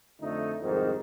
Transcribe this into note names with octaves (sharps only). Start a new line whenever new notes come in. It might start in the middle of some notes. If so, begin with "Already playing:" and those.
F2 D3 A3 D#4
C2 F2 G#2 D#3